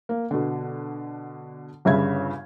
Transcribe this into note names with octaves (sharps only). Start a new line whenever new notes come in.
A#3
B2 D3
G1 G2 C#3 E5 B5 G#6